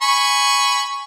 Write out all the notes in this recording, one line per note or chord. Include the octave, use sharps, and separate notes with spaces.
G#5 B5 C#6